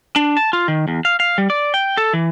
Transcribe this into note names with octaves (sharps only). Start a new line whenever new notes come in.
D4
A5
F4
D#3
E2
F5
F5
G3
D5
G5
A4
E3